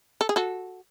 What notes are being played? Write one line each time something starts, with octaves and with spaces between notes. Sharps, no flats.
A4
G#4
F#4 A4